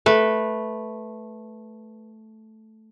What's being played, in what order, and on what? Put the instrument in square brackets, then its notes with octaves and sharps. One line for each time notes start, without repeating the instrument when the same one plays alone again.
[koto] A3 B4